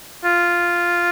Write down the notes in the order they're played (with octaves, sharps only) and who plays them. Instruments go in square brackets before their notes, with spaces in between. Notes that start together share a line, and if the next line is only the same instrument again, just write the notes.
[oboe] F4